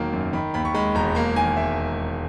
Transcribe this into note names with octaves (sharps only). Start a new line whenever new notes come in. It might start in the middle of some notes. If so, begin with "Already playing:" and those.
Already playing: E1 D#3 F#3 A#3
F#2
D#3 B5
D#2 B5
C#6
G#3 B5
E1 A#5
A#3 A#5
D#3 G#5
E5